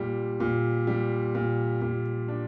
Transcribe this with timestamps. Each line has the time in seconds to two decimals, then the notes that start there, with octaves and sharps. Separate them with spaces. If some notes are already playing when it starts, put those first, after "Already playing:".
Already playing: A#2 G3
0.40 A#2
0.87 G3
1.35 A#2
1.82 A#2
2.28 D4